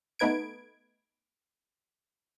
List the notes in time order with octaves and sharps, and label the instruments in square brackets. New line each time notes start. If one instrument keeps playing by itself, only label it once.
[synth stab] A3 B3 D#4 B4 G#6 D7